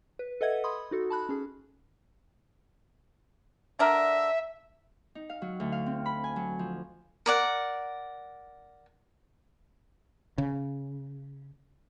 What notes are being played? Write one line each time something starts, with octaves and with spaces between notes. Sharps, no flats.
B4
A4 B4 D#5 E5 F#5 G#6
B5 C6 D#6
D#4 F#4 A4
A5 B5 F#6
C#4 G#4
D3 D4 A#4 E5
D#4
F5
F#3
D2
F5
C4
B5
G#5
F#3
F3
A#4 D5 F#5
C#3